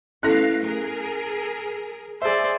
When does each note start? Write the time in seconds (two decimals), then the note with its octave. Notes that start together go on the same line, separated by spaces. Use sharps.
0.23 A3 B3 C#4 E4 A4 F5 F#6 A#6
0.64 G#4 A#4
2.22 G#4 C5 D5 E5